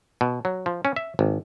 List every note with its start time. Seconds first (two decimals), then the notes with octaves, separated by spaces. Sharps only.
0.21 B2
0.45 F#3
0.66 F3
0.85 C#4
0.96 E5
1.19 G#1